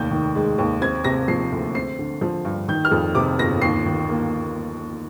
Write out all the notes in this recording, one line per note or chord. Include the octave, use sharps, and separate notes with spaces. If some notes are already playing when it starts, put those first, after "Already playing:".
Already playing: F1 D#2 G6
D#3
G#3
D#2
C4 G#6
C3 A#6
F3 C7
D2
C4 C7
D3
F3
G2
D#3 G6
F6
F2
C3 D6
G1 A#6
D#2 C7
D#3
A#3